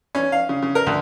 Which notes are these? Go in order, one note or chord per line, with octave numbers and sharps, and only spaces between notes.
C#4
F5
C#3
C#3
A#4
D2